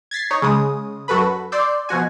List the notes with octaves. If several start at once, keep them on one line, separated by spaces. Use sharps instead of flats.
G#6 A6 B6 C7
D#4 C#5
C#3 G#3 D#6
F#2 F#4 A4 B4 B5
D5 C6 D6 E6 G6
B2 F3 F#4 G#5